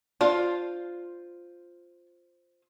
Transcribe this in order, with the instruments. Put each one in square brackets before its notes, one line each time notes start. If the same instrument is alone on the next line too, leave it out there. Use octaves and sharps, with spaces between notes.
[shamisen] D4 [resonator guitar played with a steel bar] F4 C5 F5